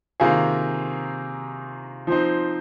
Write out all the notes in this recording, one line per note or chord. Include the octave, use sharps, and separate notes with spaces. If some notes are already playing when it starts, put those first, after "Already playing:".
C3 D#3 A#3 F4 G#4
F3 C4 D#4